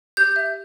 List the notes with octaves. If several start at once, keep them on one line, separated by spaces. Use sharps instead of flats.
G4 G6
E5